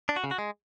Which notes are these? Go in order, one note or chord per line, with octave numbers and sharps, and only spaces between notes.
D4
F#4
C#3
F#4
G#3